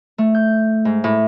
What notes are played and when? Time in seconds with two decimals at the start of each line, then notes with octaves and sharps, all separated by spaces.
0.18 A3
0.35 G6
0.85 G#2
1.04 A2